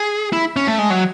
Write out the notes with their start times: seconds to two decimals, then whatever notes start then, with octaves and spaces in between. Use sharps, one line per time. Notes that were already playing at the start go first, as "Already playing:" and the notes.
Already playing: G#4
0.33 E4
0.56 C#4
0.68 A3
0.79 G#3
0.90 F#3